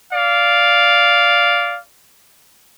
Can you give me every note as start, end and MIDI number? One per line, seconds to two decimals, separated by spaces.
0.13 1.81 74
0.13 1.81 77